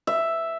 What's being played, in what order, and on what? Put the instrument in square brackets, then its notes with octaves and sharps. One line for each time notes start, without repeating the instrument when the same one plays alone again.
[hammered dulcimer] E5